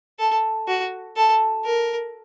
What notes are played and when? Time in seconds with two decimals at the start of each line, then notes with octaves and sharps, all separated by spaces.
0.19 A4
0.68 F#4
1.16 A4
1.65 A#4